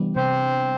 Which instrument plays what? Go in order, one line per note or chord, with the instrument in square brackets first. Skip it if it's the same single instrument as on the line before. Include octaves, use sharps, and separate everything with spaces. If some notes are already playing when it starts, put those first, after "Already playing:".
Already playing: [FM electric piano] C3 E3 G3 B3 D4
[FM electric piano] C3 [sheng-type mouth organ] C4 C5